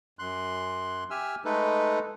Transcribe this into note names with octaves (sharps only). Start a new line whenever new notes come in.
F#2 C6 F#6
G4 E5 G#5 E6 F6
G#3 A3 D#4 A4 B4